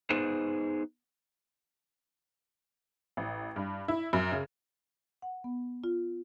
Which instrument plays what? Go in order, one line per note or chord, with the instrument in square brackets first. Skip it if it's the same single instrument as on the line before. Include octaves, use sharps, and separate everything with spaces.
[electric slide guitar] B3 D#4 G#4 B4 C5
[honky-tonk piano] A1
G2
E4
F#2
C#3
[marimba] F#5
B3
F4